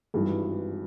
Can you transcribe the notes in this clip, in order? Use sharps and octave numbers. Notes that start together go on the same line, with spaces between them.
G#1 G2 E3